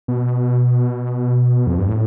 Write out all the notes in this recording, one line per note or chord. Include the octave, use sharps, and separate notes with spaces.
B2
F2
G2
A2